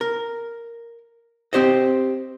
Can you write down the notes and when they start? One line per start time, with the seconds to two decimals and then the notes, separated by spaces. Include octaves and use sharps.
0.01 A#4
1.53 C4 G4 C5 D#5